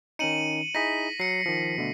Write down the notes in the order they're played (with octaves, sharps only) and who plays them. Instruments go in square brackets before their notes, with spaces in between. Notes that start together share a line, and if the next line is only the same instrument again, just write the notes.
[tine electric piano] D#3 C#4 D#4 [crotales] C#7 D#7 F#7
[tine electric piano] D#4 E4 G#4 [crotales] A#6 B6
[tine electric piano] F#3 [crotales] C7 C#7
[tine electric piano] D#3 F3
B2 D3 A3